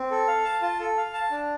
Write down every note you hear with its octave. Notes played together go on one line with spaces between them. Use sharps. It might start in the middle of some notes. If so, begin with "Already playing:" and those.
Already playing: C4
A4
F5
A5
F4
A4
F5
A5
D4